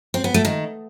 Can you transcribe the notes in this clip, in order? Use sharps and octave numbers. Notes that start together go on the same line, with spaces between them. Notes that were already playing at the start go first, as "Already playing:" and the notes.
C4
B3
A3
D#3